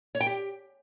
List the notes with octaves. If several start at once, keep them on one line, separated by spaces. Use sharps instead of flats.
C#5
G5
G4